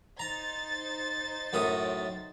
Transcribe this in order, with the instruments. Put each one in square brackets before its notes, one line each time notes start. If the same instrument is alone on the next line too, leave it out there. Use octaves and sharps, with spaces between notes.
[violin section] D#4 C5 A6 [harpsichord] A#5
[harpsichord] F#2 A2 D#6